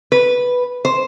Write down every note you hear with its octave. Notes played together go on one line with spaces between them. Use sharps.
B4
C5